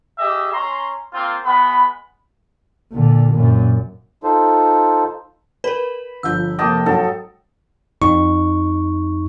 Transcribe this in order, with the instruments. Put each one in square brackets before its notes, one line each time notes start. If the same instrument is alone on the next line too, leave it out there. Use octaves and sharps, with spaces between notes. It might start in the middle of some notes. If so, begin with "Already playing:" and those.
[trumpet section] G4 G#4 D#5 E5
C#4 A#5 C6
A#3 C4 F4
G#3 B3 B5
[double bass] A#2 D3
F#2 A#2
[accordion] D#4 F4 A4 C5
[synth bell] A#4 B4 [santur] B5
[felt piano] G1 F3 G6 [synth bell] E6
[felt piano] F1 A#3 D6 [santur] D#5 G5 A5
[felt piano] G#2 F#3 [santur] A4
[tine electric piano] F2 D#4 C#6